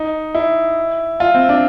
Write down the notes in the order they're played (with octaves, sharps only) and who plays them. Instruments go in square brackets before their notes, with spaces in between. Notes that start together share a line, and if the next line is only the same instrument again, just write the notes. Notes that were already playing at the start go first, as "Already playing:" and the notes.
Already playing: [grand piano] D#4
E4
F4
C4
D4